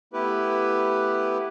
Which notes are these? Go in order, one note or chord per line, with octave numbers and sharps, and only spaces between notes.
A3 B3 E4 G4 B4